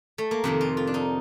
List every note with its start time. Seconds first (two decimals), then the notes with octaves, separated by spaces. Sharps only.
0.18 A3
0.31 A#3
0.44 F2 C3 D#3 C4
0.61 F4
0.77 F4
0.87 D4
0.94 D#4